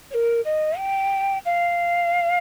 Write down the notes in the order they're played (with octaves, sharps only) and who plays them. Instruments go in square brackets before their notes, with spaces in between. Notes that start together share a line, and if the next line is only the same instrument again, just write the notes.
[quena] C#5
A#4
D#5
G5
F5